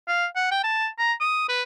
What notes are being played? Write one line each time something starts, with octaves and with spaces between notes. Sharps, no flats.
F5
F#5
G5
A5
A#5
D#6
B4